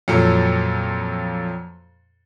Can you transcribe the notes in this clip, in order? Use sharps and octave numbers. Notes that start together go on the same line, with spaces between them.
F2 A#2 F#3 A4